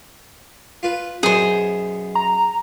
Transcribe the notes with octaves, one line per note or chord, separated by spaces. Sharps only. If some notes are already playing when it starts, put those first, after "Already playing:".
F4 B4
F#2 B2 G#4 C5
A#5